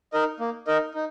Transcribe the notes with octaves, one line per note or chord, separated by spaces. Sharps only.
D#4 A#4 D#5
A#3
D#4 A#4 D#5
D#4